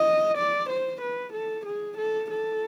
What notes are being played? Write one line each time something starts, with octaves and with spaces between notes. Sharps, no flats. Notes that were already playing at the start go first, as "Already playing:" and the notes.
Already playing: D#5
D5
C5
B4
A4
G#4
A4
A4